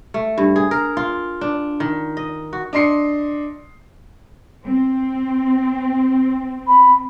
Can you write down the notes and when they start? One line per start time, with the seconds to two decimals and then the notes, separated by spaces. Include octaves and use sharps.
0.14 A3
0.38 G2
0.56 G#4
0.71 A#4
0.97 F4
1.41 D4
1.80 D#3
2.17 D#5
2.53 F#4
2.73 D4 D#5 C6 C7 C#7
4.65 C4
6.67 B5